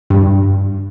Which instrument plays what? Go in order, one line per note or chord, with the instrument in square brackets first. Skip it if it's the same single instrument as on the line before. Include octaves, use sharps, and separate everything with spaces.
[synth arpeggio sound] G2